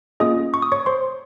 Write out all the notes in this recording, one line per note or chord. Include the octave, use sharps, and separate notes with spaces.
A#3 C#4 F4 G#4 D#5 D#6
C#6
D#6
C#5 C#6
C5 C6